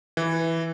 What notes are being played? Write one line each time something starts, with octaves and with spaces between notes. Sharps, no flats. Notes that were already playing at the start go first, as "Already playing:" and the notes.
E3